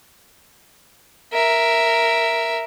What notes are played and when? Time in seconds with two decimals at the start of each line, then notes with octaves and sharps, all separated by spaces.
1.33 A#4 E5